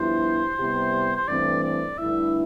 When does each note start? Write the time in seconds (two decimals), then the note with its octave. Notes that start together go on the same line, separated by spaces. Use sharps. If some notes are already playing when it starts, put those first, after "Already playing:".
Already playing: G2 F3 B3 E4 G4 C5
0.58 C3 G3 B3 E4 G4
1.16 C5
1.28 G2 E3 A3 C4 D5
1.64 D5
1.98 G2 D3 A3 E4 E5